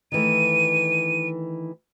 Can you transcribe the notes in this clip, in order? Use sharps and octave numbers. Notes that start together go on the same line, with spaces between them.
D#3 E3 A3 D#7